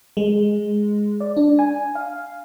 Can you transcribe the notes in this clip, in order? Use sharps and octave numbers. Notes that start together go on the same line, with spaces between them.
G#3
D5
D4
G#5
F5